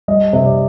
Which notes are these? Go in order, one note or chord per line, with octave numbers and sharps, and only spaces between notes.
G3 D#5
C3
D5